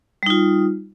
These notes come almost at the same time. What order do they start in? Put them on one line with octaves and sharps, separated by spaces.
G3 D#4 F4